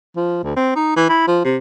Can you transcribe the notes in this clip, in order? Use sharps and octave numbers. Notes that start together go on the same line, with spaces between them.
F3
D2
C4
D#4
E3
E4
F3
C3